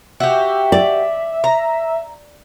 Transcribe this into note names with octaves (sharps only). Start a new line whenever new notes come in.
F#4 G4 E5
D5
A#5